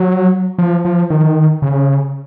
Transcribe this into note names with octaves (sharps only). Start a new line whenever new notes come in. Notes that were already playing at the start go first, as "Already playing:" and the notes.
Already playing: F#3
F3
F3
D#3
C#3